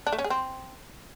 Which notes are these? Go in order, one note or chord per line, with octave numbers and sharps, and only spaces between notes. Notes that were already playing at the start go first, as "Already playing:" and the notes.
D4
A3
C#4
G#4
C4